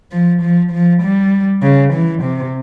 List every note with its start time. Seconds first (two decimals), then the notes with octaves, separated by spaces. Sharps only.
0.12 F3
0.42 F3
0.72 F3
1.02 G3
1.63 C#3
1.93 E3
2.23 C3